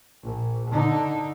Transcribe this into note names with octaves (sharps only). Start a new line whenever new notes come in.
A#1
D3 D#4